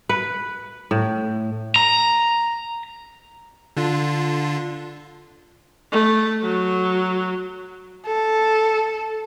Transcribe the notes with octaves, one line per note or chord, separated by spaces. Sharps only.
B4
A2
A#5
D3 D4 F4
A3
F#3
A4